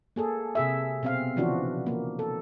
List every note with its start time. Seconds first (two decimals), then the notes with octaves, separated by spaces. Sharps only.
0.16 A#3 G#4 A4
0.55 C3 G#4 E5
1.03 B2 C4 F5
1.36 C#3 E3 F3 D4 F4 F#4
1.87 A#3
2.19 A4